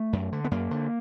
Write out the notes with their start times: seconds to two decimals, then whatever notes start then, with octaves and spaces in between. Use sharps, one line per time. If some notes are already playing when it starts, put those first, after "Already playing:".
Already playing: A3
0.13 F#2
0.32 D3
0.45 B3
0.51 F#2 A#3
0.71 D3